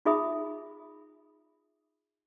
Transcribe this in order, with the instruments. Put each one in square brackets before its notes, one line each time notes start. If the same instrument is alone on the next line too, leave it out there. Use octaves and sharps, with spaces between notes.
[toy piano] D#4 F4 G#4 E5 B5 D#6